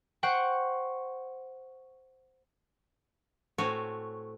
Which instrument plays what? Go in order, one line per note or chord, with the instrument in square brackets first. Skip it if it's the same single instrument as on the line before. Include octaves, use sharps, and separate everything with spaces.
[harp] C5 F#5 G5 C#6
[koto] A2 A3 C4 F#4 C#5 G#5